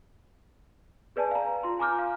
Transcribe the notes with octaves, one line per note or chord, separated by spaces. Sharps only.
G#4 B4 D5 G#5 A5
F5 A#5
F4 C6
G#5 A#5 D6 F6 G6
F5